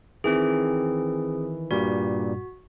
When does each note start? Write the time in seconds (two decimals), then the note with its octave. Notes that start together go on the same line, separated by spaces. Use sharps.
0.24 D#3 E3 C4 G#4
1.71 G2 A#2 G3 F#4